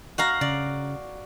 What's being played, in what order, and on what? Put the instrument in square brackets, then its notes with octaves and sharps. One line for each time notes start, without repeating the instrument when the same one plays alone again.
[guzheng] F#4 F5 A#5
[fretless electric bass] C#3 [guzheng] D5